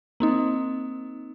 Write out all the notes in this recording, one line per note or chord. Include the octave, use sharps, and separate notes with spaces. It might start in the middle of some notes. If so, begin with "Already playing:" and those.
A#3 C4 D#4